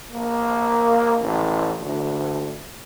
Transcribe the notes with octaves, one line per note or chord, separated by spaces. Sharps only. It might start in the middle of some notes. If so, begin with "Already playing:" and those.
A#3
A1
D2